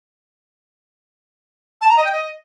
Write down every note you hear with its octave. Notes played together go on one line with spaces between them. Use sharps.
A5
A#5
D#5
G5
D#5